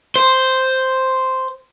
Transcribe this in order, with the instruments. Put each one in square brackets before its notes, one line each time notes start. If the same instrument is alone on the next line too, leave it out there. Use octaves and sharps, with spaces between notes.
[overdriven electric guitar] C5